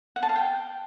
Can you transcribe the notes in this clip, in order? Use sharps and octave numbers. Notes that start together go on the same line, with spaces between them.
F#5
A5
F5
G5